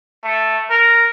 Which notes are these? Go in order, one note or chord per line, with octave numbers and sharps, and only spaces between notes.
A3
A#4